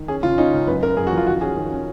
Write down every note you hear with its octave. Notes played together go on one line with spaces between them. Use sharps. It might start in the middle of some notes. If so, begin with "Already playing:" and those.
Already playing: D#3
C#4 G#4
C#3 F4
C#4 D#4
C#2
F#2 B4
F#2 A#4
F#2 G#4
F#4
F3
F4
D#3 F#4
C#4 G#4
D#3
C#4